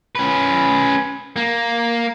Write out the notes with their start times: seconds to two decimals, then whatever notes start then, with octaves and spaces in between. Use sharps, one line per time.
0.15 C#4 B4
1.36 A#3